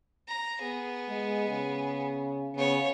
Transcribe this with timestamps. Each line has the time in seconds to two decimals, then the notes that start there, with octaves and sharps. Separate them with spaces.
0.28 A#5
0.60 B3 G#4
1.09 G#3
1.49 C#3
2.56 C#3 B3 C#5